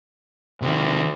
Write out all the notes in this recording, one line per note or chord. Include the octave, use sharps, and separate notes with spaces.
D2 C3 D#3